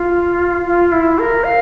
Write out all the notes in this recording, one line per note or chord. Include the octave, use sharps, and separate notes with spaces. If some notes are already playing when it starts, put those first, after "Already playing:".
Already playing: F4
F4
E4
A#4
F5